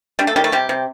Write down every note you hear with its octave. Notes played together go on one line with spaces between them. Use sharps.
G3 D4
A3 A4
D#3 G3 G4
A3 A4
C3 G3 G4
C3